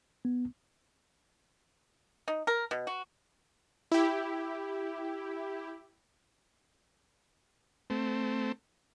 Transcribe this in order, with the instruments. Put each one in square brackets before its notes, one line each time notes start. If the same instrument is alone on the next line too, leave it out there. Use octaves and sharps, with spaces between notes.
[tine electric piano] B3
[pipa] D#4
A#4
B2
F#4
[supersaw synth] E4 G4
[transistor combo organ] A3 C4